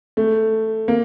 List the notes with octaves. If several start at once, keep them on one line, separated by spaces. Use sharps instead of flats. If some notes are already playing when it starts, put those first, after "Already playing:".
A3
A#3